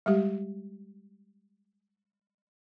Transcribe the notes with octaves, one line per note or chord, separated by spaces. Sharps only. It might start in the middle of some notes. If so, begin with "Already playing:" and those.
G3 G#3 G4